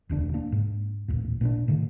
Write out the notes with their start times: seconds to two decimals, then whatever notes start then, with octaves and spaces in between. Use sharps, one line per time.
0.09 E1 D2 D4
0.34 A#3 D4
0.52 G#2
1.08 A1 D#2 A#2
1.41 A#2 C#4 D4
1.68 A2 D3 D#3